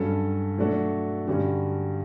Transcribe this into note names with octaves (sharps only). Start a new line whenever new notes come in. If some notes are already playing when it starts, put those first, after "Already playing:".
Already playing: G2 F#3 C#4 F#4 A4
F#3 A3 D4 F#4 A4
G2 D3 G3 C#4 F#4